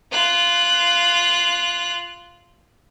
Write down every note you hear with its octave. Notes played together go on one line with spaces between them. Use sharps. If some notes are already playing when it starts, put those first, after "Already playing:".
F4 F#6